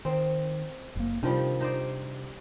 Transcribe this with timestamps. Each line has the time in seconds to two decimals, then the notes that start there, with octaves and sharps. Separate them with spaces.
0.05 D#3 C4
0.96 F#1 A#3
1.23 C3 D#3 F3 G3 D4
1.60 D#4 C5 D5